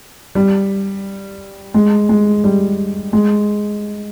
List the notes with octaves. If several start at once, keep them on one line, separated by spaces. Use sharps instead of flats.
G3
G#3
G#3
G3
G#3